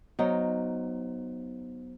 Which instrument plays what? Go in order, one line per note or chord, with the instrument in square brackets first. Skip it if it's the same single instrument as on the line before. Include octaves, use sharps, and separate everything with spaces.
[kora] F#3 D#4 [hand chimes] B3 C5